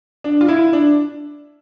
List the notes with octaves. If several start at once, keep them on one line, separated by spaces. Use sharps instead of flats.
D4
F4
E4
D4